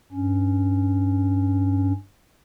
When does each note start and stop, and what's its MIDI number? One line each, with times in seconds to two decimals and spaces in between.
0.12 1.92 43
0.12 1.92 61